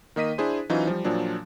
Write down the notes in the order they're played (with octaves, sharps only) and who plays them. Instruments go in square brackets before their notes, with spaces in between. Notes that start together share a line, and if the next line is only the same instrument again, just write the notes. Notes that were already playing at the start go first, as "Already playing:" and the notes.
[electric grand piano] D#3 A#3 D#5 B6 D#7
D4 E4 G#4 C5
E3 F#3 C#4 D#4 F4 C5
F3 G3
A#2 F3 F#3 D4